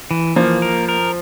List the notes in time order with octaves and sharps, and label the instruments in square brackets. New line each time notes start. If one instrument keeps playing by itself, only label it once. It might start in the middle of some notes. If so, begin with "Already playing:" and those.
[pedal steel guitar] E3
[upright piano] F3 [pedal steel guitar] A#3
[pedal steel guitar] A#4
A#4